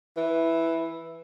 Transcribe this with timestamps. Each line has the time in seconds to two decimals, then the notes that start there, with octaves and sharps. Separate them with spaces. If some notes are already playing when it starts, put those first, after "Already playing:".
0.17 E3